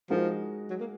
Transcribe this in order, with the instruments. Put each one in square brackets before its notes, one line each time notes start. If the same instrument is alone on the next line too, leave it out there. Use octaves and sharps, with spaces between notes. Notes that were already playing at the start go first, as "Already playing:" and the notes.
[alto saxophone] F3 [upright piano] G#3 D#4 F#4 A#4
[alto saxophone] F#3
A#3